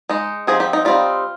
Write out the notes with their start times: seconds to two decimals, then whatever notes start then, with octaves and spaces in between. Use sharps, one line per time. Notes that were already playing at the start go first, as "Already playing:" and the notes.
0.09 G#3 D#4
0.47 F3 C4 D#4 G#4
0.60 G4
0.73 D#4
0.85 G3 C4 D#4 F4